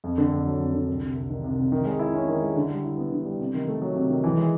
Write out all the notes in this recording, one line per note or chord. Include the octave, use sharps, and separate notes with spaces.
F2
D3
F2
F#3
F2
D3
C2
C3
C2
D#3
C2
C3
D#3
G#3
E4
C#4
D#3
G#3
D3
G3
E4
B3
D3
G3
C3
D#3
A3
F#3
C3
D#3
E3
G#3